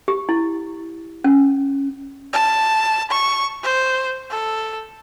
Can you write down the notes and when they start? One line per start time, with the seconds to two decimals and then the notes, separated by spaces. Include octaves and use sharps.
0.08 G4
0.29 E4
1.24 C#4
2.33 A5
3.10 C#6
3.63 C5
4.30 A4